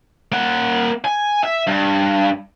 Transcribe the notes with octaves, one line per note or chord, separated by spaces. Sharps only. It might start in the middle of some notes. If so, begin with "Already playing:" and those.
A#3 F#5
G#5
E5
G2